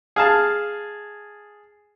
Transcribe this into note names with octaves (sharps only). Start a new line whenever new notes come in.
G#4 F5 A5